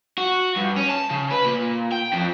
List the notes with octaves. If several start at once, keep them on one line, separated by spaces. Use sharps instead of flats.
F#4
G2
C#4
A5
C#3
B4
A#2
G5
F2